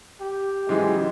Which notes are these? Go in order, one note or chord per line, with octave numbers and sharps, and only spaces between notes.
G4
G#2 C#3 E3 F#3 G#3 C#4